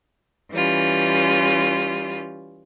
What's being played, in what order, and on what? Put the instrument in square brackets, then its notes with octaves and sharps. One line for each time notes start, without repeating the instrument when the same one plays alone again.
[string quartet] E3 G3 C#4 F4